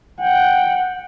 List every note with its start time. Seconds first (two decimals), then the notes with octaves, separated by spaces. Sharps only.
0.20 F#5 G5